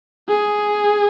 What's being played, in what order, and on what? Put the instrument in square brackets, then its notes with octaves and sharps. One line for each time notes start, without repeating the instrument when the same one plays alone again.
[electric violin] G#4